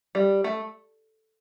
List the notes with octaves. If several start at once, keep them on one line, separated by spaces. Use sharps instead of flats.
G3
A3